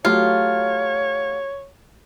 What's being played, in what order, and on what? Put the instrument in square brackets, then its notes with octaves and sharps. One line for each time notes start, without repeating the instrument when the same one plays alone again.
[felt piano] F#3 A3 G4 [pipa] F4 [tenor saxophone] C#5